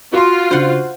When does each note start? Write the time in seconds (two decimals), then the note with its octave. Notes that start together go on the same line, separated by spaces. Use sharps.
0.13 F4 F#4 C6
0.51 C#3 D4 C5 F#5